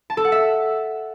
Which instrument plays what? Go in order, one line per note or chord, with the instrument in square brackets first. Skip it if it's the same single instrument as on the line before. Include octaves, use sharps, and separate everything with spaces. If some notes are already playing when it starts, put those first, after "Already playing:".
[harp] A5
A4
F#5
E5